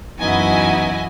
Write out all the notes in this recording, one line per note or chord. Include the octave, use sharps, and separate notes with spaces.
F#2 E3 B3 D#4 E4 F#4 D#5 G#5